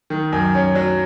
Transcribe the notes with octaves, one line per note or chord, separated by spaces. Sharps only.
D#3
F#2
C#4
F#3